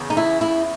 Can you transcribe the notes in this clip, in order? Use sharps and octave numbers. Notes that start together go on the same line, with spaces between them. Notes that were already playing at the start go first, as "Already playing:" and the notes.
Already playing: E2 C#3
D#4
E4
E4